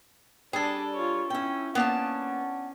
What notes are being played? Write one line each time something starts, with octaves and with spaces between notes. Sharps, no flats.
G3 D4 G#4 A4
F4 C#5
C#4 E4 G5
A#3 B3 C#4 D4 A5